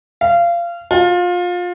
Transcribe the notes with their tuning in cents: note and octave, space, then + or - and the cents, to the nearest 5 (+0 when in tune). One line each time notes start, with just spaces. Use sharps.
F5 -25
F4 +25